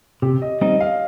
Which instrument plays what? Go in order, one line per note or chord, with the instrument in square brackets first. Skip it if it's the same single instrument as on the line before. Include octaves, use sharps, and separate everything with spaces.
[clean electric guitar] C3 [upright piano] G4
[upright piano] D#5
[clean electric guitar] G3 C4 D#4 [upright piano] D#5
[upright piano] F5